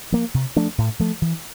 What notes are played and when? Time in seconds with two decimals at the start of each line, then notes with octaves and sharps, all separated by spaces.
0.12 F3 A#3
0.34 C3
0.56 F3 A3 D4
0.78 A2
0.99 F3 A3
1.22 E3